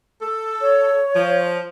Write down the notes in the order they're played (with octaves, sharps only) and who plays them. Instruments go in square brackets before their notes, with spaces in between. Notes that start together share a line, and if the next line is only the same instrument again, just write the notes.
[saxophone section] A4
[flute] C#5
[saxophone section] F3